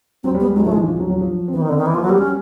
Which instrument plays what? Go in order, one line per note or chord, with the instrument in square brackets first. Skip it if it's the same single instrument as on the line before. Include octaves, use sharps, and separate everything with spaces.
[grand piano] F#3 [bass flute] C4
[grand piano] G3
[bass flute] B3
[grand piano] G#3
[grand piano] F#3 [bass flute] G#3
[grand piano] F3 [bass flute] A3
[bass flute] G#3
[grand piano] E3
F3
F#3
F#3
F3
C4
[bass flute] E3 [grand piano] B3
[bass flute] D#3
[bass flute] D3 [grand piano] C4
[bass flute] D#3
[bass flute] E3 [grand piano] B3
[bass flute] F3 [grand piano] A#3
[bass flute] F#3
[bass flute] G3 [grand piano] A#3
[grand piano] G3 [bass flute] C#4